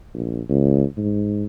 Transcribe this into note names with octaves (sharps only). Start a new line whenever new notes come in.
A#1
C#2
G#2